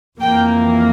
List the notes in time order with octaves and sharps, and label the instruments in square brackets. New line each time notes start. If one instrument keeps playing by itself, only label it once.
[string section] F2 E3 A#3 G5